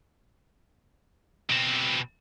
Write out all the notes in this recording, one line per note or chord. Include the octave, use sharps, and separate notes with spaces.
B2 C4